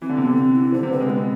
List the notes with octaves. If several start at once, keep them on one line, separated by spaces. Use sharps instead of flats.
E3 C4
D3
C3
D3 B3
C4
E4
D3 C5
C3
D3 B4
G#3
B3 C4